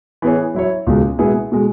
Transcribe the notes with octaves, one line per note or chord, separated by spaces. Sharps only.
E3 B3 G#4 C#5
F#3 E4 C#5
C#2 B2 G#3 C#4
B2 G#3 B3 E4 G#4
B2 G#3